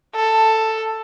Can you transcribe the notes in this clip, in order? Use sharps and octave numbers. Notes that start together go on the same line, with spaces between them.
A4